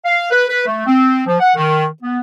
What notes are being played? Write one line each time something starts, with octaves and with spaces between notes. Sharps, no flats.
F5
B4
B4
A3
C4
F3
F#5
D#3
B3